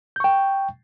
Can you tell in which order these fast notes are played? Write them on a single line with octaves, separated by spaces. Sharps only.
G6 C#6 G5